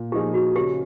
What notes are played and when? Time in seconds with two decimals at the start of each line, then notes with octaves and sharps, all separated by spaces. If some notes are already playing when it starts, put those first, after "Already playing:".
Already playing: A#2
0.12 F3 A#3 D#4 G4 G#4
0.34 F#4
0.56 C#3 G4